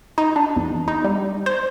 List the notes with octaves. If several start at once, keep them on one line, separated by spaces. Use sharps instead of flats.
D#4
D4
E2
D#4
G3
C5